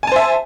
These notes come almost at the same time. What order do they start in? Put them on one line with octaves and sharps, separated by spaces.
G#5 A5 C5 E5